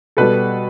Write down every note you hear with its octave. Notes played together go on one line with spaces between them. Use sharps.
B2 G3 A4 B4